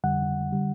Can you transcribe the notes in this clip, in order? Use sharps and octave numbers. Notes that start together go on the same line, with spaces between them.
F2 D3 G3 F#5
D3 G3